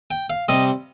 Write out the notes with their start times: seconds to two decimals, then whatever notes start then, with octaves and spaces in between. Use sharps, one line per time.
0.11 G5
0.30 F5
0.48 C3 G3 D#5